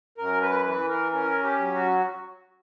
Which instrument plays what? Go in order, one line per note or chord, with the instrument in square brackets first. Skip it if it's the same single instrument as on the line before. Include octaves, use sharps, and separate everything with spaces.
[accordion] F#2 A#4
B4
E3 B4
A#4
C#4 A#4
G4
F#3
F#4